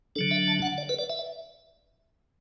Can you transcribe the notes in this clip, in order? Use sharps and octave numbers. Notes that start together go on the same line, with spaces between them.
D3 F#3 D4 A4
E5
A5
F#5
D5
B4
D5
E5